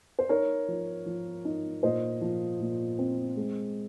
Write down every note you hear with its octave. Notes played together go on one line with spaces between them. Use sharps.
C5
D#4 A#4 C#5
F3
F3
D#4
A#2 C5 D#5
F3
A#2
C4
G#3